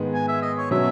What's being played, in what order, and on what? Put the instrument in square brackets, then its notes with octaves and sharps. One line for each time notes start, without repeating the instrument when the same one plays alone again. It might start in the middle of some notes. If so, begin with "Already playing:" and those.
Already playing: [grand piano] G#2 D#3 G#3 B3
[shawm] G#5
E5
D#5
C#5
[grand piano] B2 F#3 C#4 [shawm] E5